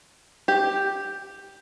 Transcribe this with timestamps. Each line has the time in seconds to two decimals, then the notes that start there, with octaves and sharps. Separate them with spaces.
0.48 G4